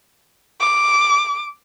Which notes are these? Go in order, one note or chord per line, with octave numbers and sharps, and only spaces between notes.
D6